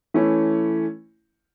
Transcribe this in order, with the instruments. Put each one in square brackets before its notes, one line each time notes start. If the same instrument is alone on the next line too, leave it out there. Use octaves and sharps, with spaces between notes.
[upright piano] E3 A3 C#4 E4